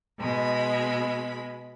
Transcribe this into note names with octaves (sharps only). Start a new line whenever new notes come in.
B2 G#3 B5